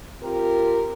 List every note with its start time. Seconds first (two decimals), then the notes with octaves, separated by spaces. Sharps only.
0.22 C4 F4 G4 A#4